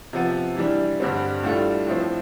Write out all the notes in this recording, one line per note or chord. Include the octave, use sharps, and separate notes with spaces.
C3 F3 B3
E3 G3 D4
G2 D3 G3 C4
A2 G3 D4 F4 A4
A2 F3 C4